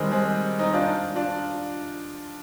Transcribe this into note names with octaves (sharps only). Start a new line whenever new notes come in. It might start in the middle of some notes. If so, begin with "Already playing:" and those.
Already playing: D#3 G3 G#3 C4
G#3 C4
C4 D#4
D4 F4
D4 F4